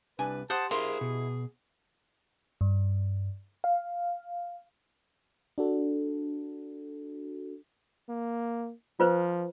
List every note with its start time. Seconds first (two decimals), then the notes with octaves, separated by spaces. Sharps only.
0.19 C2 D4 B4 G#5
0.50 G4 C5 F#5 A5 D#6
0.71 E4 G#4 A#4 C5 F5 C6
1.01 B2
2.61 G2
3.64 F5
5.58 D4 F#4 A4
8.09 A#3
9.00 F3 F4 B4 C5